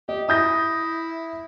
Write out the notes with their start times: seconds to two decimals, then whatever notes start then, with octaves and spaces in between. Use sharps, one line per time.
0.09 G4 D#5
0.29 E4 D#6 G6 A#6